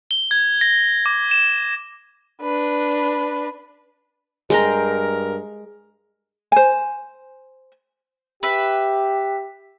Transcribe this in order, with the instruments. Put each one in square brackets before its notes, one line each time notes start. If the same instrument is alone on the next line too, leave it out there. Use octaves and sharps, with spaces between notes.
[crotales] G7
G#6
A#6
D6
E7
[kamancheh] D4 B4
[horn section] G2 A#4 [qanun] G#3 G5 A#5
[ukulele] C5 G#5
[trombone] G4 [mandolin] B4 E5